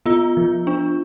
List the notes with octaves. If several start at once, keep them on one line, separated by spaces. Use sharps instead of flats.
B3 F4
F3
D4